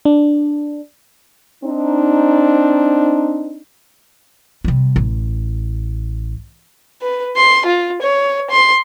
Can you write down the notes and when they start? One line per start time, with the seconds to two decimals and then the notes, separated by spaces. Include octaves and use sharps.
0.05 D4
1.64 C4 D4 D#4
4.64 C3 G3
4.96 A1
7.02 B4
7.36 C6
7.66 F4
8.02 C#5
8.50 C6